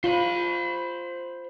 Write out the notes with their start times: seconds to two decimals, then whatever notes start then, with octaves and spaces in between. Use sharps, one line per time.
0.04 F4 C5 B5